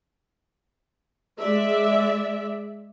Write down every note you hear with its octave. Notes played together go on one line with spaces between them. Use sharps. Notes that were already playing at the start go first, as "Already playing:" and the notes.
G#3 D5 E5